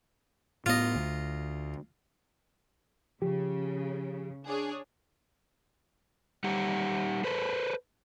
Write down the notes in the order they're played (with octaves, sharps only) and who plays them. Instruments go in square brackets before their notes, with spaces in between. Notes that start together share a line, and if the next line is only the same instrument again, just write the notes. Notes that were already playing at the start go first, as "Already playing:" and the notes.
[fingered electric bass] A2 B3 [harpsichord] F4 D#5
[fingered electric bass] D2
[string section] C#3 [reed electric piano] F3 G4
[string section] D4 G#4 C#5
[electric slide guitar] G3 D#4 G4 F#5
A4 B4 C5